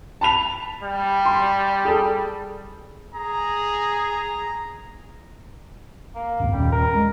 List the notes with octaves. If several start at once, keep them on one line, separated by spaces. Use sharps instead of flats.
A5 B5 F7
G3
C6
G#4 A4
G#4 A#5
A#3
C#2 G2
D#2 A#2 G3 C#4
A#4
G#3